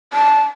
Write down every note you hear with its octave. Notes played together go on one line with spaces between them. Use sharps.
A5